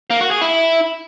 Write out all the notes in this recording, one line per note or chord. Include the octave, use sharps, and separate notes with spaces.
A#3
F#4
G#4
E4